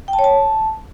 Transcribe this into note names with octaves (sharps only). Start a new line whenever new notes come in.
G5
A5
C#5
A5